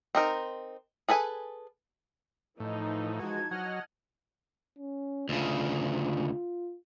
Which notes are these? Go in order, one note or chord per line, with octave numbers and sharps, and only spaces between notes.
C4 D#4 A#4
G#4 A4 B4 G#5
A2 E3 F3 D#4
G#3 F#4 A5 G#6
F#3 D#5 F#5 F6
C#4
D2 C#3 F4